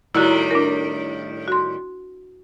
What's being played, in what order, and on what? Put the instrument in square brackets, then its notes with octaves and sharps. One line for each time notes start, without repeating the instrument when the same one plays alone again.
[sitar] A2 D#3 G3 [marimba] E4 F#4
[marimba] D4 A#4
F#4 C6